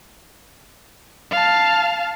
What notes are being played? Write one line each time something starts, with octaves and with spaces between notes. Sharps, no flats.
F5 A5